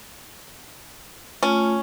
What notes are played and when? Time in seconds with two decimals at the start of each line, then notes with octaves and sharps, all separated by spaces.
1.43 A3 C#4 F4